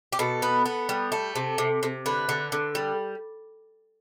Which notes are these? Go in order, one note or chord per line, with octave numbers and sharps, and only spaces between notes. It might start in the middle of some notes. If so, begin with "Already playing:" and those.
G4
B2 A4
B3
B3
G3
A3
C3
C3
C3
D3 B4
D3
D3
G3